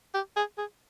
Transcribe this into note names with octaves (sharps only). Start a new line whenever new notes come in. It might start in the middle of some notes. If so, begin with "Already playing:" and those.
G4
G#4
G#4